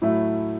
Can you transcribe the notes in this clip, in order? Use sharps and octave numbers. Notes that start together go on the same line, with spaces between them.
A2 F#3 A3 E4